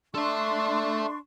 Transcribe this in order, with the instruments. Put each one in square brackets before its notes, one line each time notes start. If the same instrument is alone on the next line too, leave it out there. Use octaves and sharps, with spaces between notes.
[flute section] D4 C6 C#6 [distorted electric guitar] A4 E5